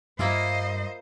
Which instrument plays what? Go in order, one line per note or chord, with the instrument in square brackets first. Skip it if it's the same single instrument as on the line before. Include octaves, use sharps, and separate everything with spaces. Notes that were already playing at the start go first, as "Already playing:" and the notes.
[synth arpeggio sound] G2 [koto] A#3 E4 F4 [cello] C5 D#5